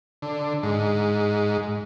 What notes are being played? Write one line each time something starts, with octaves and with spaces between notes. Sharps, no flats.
D3
G#2